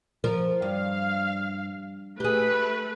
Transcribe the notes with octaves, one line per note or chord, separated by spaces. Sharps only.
F3 A#4
G2 F5
A3 G4 G#4 B4